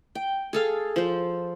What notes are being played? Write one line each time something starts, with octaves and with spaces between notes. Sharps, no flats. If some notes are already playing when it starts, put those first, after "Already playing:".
G5
G#4 A4 F5
F3 C5